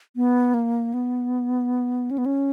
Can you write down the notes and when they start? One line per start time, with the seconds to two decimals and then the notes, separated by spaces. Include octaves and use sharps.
0.16 B3
0.54 A#3
0.94 B3
2.11 C#4
2.18 B3
2.26 C#4